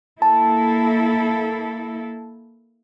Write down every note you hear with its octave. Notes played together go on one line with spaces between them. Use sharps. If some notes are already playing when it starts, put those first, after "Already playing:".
A#3 E4 A4 A5